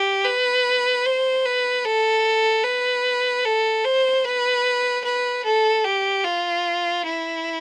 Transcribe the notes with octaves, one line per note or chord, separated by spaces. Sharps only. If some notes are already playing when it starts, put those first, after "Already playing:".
Already playing: G4
B4
C5
B4
A4
B4
A4
C5
B4
B4
A4
G4
F4
E4